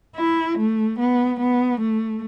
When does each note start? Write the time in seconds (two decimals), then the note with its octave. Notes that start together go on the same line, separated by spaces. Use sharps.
0.16 E4
0.58 A3
0.99 B3
1.40 B3
1.80 A3